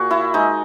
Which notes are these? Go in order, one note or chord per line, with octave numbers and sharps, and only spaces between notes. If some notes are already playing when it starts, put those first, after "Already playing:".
Already playing: A#2 F#4 G#4
E4
G#3 D#4